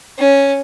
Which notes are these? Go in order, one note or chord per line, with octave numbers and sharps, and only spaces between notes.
C#4